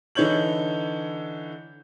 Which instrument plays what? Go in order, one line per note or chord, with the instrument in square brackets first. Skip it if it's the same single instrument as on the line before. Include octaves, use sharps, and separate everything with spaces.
[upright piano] D3 E3 D#4 C#5 G6 F#7